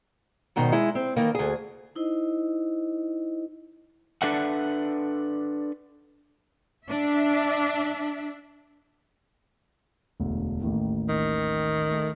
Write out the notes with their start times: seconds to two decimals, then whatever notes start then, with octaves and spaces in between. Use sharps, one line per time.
0.56 G#2 B2 D#3
0.72 G#3 E4
0.95 C4
1.16 D#3 E3 A#3
1.35 D2 G#4
1.96 D#4 E4 C5 D#5
4.22 D4 A4 B4 D5 E5 F#5
6.86 D4 E5
10.20 E1 D2
10.62 A1 D#2 A2
11.09 D#3
11.91 A3